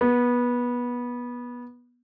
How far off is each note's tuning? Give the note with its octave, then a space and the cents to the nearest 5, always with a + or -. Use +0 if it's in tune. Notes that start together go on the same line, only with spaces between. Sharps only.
B3 -20